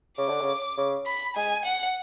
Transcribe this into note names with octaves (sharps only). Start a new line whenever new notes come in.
C#3 D6
D3
C#3
C#3
B5
G#3 G#5
F#5